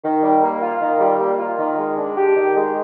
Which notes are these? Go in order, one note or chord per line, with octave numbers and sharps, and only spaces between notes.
D#3
G3
A#3
F4
D#3
G3
A#3
F4
D#3
G#3
D4
G4
D#3
G#3